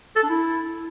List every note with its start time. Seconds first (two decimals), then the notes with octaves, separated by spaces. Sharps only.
0.16 A4
0.23 D4
0.30 E4